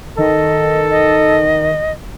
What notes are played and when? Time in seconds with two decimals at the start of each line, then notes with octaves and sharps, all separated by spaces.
0.18 D#3 A4 D#5
0.90 D#5